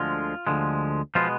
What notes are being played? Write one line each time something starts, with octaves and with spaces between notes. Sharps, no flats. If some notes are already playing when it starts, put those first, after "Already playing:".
Already playing: D2 D3 F3 G#3 F4
D2 D3 F3 G#3
B2 F3 G#3 B3 F4